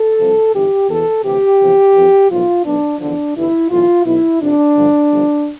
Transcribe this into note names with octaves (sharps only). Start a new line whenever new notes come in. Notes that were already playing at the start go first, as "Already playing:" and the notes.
Already playing: A4
C2 C3 F3
G1 G2 E3 G4
E2 B2 A4
D2 C3 E3 G4
E2 C3 F3
F2 E3
B1 A2 F3 F4
B1 B2 D4
E2 D3 F3 D4
G1 G2 E3 E4
B1 A2 E3 F4
B1 B2 E4
F2 C3 F3 D4
G1 G2 D3 F3
G1 G2 F3